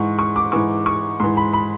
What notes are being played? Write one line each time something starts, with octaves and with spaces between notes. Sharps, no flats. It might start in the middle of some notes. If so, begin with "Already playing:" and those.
Already playing: G#2 E3 C#6
C#6
D6
G#2 E3 C#6
C#6
G#2 E3 C6
B5
B5